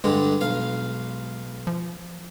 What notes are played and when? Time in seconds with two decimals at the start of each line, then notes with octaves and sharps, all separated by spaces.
0.04 G2 D3 G3 G#3
0.41 B1 F5
1.67 F3